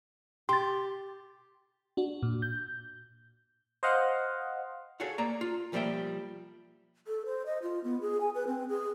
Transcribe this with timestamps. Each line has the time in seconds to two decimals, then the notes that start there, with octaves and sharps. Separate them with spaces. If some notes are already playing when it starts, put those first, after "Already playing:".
0.49 G4 C6 A6
1.97 D4 F#4
2.23 A#2
2.42 G6
3.83 C5 D#5 F5 F#5
5.00 F#4 G#4 A4 C#5 F5 F#5
5.18 A#3 D5 A#5
5.41 F4
5.72 B1 F3 G3 A#3 E5 G5
7.07 A4
7.26 C5
7.46 D#5
7.62 F4
7.84 B3
8.01 G#4
8.20 G#5
8.35 B4
8.47 C4
8.69 G#4